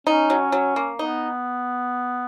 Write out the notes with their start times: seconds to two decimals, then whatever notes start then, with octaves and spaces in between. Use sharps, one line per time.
0.07 C#4 D#4
0.30 F#3
0.52 F#3
0.76 A#3
0.99 B3 D#4